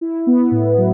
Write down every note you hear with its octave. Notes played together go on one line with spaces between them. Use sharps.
E4
B3
A2
F#3